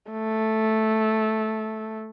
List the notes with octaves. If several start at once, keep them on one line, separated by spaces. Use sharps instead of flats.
A3